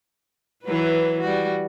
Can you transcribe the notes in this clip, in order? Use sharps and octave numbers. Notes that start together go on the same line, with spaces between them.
E3 F#3 B4
G3 F#4